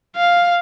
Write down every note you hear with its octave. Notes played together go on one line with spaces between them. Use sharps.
F5